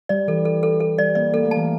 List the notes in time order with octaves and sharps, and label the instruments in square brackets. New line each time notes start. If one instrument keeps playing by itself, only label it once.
[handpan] G3 [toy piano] D5
[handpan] E3 [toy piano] A4
[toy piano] A4
A4
A4
[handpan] G3 [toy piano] D5
[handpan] A#3 [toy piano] D5
[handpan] A#3 [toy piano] A4
[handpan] A3
[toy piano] A5
[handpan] E3